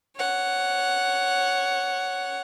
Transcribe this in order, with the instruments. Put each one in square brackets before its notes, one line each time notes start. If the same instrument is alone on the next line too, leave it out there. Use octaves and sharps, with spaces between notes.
[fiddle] C#5 F#5